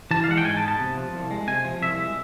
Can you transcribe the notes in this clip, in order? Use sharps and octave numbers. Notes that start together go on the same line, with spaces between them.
E3 A5
F5
G#3 F#5
G5
G#2 G#5
A5
B3
A5
C3
F3
C2
G#3
C3 G#5
F3
C2 E5
G#3